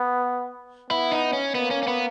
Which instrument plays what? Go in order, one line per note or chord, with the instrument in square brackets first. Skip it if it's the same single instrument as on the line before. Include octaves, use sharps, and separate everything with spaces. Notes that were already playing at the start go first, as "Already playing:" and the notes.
Already playing: [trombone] B3
[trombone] B3 [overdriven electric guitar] E4
[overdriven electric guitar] D#4
C#4
[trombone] A#3 [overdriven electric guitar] B3
[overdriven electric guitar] C#4
C#4
B3